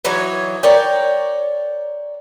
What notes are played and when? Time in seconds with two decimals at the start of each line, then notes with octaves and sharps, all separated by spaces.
0.05 E3 F#3 D#4 C#5
0.63 A#4 C#5 D5 G5